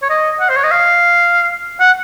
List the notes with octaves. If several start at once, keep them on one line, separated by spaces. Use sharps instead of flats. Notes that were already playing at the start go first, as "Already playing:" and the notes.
C#5
D#5
F#5
C5
C#5
D#5
F5
F#5